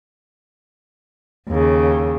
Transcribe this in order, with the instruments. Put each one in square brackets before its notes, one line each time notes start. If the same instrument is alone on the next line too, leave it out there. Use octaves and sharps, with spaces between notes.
[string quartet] D#2 C#3